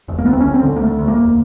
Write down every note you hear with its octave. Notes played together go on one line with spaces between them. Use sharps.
E1
A#3
D2 B3
C4
D2 C#4
C4
D3
A#3
D2 A3
D2
A#3
E1